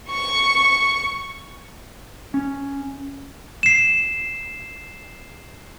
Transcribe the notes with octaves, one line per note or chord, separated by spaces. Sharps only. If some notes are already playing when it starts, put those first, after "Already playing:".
C#6
C#4
C7 E7